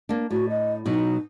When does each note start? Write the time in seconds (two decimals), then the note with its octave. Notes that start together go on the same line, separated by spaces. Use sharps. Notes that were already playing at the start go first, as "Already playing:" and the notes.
0.09 A#3 D4
0.31 A2 F#4
0.49 D#5
0.86 B2 F#3 D#4